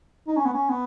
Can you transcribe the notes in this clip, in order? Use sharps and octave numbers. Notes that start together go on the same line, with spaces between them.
D#4
C#4
B3
C#4
B3